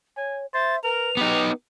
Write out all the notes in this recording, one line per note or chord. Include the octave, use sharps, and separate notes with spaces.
C#5 G#5
C5 E5 A6
A#4 B4 F7
B3 D#4 G4